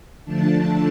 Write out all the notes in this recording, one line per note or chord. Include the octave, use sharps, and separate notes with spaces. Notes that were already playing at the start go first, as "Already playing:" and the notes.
D3 F3 A3 D4 A5